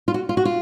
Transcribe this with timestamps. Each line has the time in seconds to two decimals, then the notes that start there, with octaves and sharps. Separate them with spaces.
0.08 F4
0.14 F#4
0.29 F4
0.37 F#4
0.45 F4